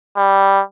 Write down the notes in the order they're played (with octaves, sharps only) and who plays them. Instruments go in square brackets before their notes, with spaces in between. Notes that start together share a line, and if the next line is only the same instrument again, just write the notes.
[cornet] G3